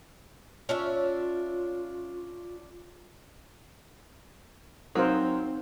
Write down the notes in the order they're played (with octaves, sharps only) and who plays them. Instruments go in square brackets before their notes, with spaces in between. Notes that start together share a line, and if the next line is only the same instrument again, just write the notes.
[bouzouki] C#4 D4 E5 [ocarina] F4
[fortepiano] F#3 [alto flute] C4 [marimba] D#4 F5 [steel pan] A#4 C5